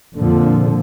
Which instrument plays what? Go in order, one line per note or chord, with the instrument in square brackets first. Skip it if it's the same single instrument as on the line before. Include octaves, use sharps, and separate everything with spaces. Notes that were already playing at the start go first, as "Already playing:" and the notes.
[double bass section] F2 A#2 D3 F3